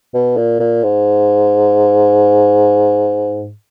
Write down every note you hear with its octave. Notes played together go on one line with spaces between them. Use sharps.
B2
A#2
A#2
G#2